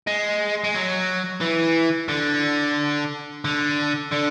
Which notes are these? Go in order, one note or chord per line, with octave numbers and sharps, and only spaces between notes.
G#3
G#3
F#3
E3
D3
D3
D3